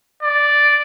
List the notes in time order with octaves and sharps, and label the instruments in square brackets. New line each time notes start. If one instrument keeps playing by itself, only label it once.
[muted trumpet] D5